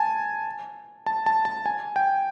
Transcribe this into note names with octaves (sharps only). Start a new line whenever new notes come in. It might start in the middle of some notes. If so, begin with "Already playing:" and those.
Already playing: G#5 A5
A5
A5
A5
G#5
G5